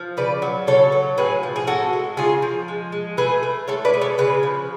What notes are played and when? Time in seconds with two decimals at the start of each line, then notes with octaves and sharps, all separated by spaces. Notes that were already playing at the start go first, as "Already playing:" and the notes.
Already playing: F3
0.17 C#3 B4 D5
0.42 F#3
0.67 C#3 A4 C#5
0.92 F#3
1.18 A2 G#4 B4
1.43 F3
1.56 G#4
1.67 G#3 F#4 A4
1.93 G#3
2.17 C#3 F4 G#4
2.42 F3
2.68 G#3
2.92 G#3
3.17 A3 G#4 B4
3.43 A3
3.68 G#3 A4 C#5
3.85 B4 D5
3.94 G#3
4.01 A4 C#5
4.18 C#3 G#4 B4
4.43 F3